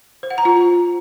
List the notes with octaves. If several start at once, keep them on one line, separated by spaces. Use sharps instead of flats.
C5
F#5
A#5
F4